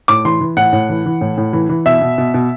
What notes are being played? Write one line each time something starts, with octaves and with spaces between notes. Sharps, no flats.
A2 D6
E3 C6
E3
A2 F#5
A2
E3
E3
A2
A2
E3
E3
B2 E5
B2
B2
B2